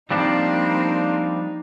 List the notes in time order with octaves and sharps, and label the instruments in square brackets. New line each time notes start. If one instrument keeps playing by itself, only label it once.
[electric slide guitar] F3 G3 D4 [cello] A#3 C4 [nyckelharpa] D#4